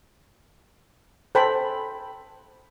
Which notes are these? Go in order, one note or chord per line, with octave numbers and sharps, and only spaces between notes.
A4 C5 G5 G#5 B5